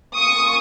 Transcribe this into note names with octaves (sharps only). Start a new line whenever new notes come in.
A#3 C#4 F4 C#6 D#6